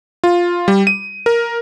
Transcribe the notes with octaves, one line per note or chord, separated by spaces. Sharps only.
F4
G3
D#7
A#4